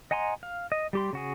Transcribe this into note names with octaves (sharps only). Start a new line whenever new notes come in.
D#5 F#5 G#5 A#5 C6
F5
D#5
G3 G4 C6
C#3 F#4 G#4